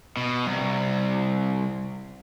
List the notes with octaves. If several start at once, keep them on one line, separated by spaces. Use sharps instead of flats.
B2
C2